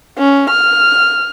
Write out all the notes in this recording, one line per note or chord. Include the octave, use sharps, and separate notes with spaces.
C#4
F6